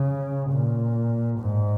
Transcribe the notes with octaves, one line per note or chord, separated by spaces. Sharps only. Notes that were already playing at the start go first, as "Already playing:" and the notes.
Already playing: C#3
A#2
G#2